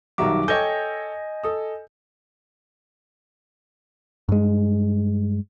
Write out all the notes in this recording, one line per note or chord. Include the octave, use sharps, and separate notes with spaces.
B1 D#3 G3 F#4 E5 A#5 D6
A4 C#5 D#5 G5 G#5 G6
A4 D#6
G2 G#3